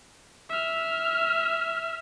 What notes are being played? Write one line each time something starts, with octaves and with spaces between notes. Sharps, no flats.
E5 F6